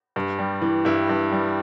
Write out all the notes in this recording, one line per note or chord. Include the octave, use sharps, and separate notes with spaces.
G2
G3
E3
G2 E4
G2
G3